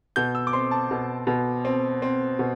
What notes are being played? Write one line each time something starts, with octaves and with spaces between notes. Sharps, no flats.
B2 G6
E6
D6
C4 C6
A5
B2
B2
C4
C4
B2